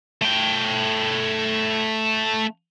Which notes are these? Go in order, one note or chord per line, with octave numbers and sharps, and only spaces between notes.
A3 G5